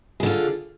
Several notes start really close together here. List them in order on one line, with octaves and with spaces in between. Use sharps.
G#4 D3 F4